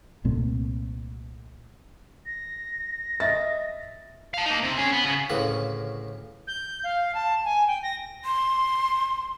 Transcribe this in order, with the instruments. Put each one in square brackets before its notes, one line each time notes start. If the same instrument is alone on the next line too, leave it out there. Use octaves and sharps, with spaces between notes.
[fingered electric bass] C2 A#2 A3 C4
[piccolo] A#6
[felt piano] D#5 E5 A6
[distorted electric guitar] F5 A5
A#3 D#4
C3
C#4 G#4
B3
C#3
[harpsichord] D2 A2 C#3 A#3 B4 D#6
[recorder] G6
F5
A5
G#5
G5
A#6
[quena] C6